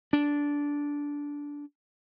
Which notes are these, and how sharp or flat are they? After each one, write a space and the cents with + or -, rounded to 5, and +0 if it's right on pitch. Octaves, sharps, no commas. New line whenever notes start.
D4 -15